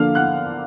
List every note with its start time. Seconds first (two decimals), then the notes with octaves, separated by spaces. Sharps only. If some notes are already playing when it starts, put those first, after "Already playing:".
Already playing: D3 F3 A#3 D4 F5 F6
0.15 F#5 F#6